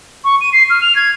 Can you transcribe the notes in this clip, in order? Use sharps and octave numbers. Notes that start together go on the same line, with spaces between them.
C#6
D#7
C7
F6
F7
G#6